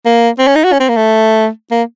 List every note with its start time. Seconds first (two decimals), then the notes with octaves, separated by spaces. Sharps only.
0.05 A#3
0.39 C4
0.47 C#4
0.55 D#4
0.64 F#4
0.72 C#4
0.80 C4
0.89 A#3
0.96 A3
1.71 A#3